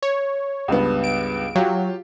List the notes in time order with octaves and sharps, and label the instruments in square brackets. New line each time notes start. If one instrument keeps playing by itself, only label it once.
[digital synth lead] C#5
[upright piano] C#2 G2 B3
[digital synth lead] D7
[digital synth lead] F#3 [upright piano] F4 G4